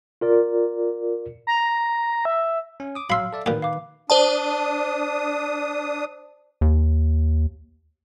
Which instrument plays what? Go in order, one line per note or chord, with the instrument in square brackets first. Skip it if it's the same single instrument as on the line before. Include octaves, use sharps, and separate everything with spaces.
[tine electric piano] F4 A#4 D5
[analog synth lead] A#5
E5
[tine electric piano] C#4
D6 D#6
[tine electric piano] F#3 [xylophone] F5 E6 F6 [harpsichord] B5 C6
[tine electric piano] A4 D5 E5
[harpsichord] A#2 G4 [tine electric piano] D#3 B4
[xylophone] F5 D6
[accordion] D4 D#6 [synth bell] C5 D5 A5
[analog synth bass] D#2